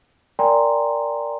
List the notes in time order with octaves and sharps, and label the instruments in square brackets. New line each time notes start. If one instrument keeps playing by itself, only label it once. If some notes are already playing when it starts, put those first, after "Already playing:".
[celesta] A#4 D5 G5 G#5 A#5 C6